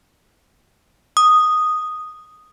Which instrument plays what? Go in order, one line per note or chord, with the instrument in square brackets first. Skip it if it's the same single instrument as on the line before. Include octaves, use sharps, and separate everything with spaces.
[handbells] D#6